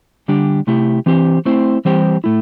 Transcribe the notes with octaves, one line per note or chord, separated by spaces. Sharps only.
D3 G3 D4 G4
C3 A3 E4 G4
E3 C4 G4 C5
A3 C4 E4 C5
E3 G3 C4 G4 C5
A2 A3 E4